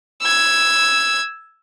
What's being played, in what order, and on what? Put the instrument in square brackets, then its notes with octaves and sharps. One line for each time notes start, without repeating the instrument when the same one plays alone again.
[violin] E6 G#6